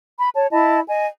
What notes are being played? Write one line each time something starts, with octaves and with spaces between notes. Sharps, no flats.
B5
C#5 A5
E4 D#5 A5 B5
D#5 G#5